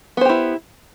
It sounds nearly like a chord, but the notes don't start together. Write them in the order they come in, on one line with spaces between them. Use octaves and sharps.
B3 C5 G4 E4